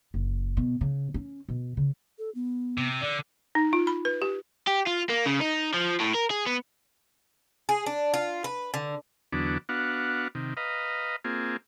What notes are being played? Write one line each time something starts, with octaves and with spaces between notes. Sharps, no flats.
F#1
B2
C#3
C#4
B2
C#3
A4
B3
C3
D3 D5
D#4
F4
B5
B4
G4
G4
F4
A#3
C#3
D#4
F3
A2
A#4
G#4
B3
G#4
D4
F4
B4
D3
E2 D3 F#3 B3 D4
B3 D4 F#4 F5 F#5
C3 D#3
B4 D#5 F5 A#5
A#3 C4 F4 G#4